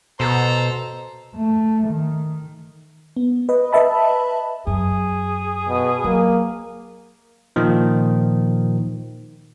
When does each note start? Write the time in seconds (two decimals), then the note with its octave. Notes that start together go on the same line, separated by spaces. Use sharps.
0.20 B2 A4 C5 A#5
1.36 A3
1.88 D#3
3.17 B3
3.49 B4 D#5
3.73 B4 D#5 E5 A5 B5
4.67 F#2 G#4
5.68 B2
6.04 F#3 A#3
7.56 A#2 D#3 F3